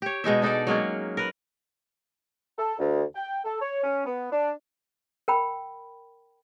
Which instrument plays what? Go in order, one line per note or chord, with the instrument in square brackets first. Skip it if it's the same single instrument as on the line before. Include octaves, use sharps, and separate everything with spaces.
[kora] G4 C#5
B2 G#3 D#4 E5
D4 D#4 A4 D5
F#3 G#3 A#3 C#4
A#4 B4
[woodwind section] A4
D2
G5
A4
C#5
C#4
B3
D4
[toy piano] A#4 G5 B5